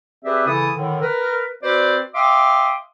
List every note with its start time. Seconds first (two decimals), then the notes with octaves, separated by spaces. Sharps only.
0.24 C4 G4 G#4 B4 D5 E5
0.47 C#3 E3 E4 A4 D#6
0.75 A2 D3 D#3
1.01 A#4 B4
1.63 C4 F#4 B4 C5 D5
2.14 E5 F5 G5 C6 D6 D#6